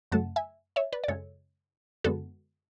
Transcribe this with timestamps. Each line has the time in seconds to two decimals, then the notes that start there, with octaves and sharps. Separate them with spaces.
0.12 F#2 C#3 F#3 A3 F#5 A5
0.36 E5 G#5
0.76 C#5 E5
0.92 B4 D5
1.04 D5
1.08 F#2 C#3 G#3 A4 C#5
2.04 F#2 D3 G#3 B3 F#4 A4